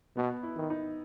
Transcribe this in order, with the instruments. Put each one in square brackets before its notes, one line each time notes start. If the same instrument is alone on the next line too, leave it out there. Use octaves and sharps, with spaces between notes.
[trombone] B2 [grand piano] B3
[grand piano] E4
[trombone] D#3
[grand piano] D#4